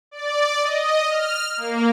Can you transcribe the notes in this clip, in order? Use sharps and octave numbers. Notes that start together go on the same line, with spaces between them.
D5
D#5
F6
A#3